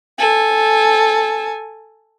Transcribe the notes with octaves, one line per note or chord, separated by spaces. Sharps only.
A4 G#5